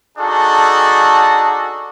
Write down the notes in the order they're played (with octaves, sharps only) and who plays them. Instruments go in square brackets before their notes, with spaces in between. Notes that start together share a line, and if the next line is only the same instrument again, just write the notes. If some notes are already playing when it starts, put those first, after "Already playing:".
[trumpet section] D4 D#4 F#4 G#4 A4